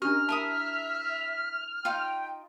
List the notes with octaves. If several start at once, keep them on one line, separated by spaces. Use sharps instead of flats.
C#4 D4 G4 A#4 D#5 F6
E4 A#4 E5 A5 D#6
D#4 F4 G5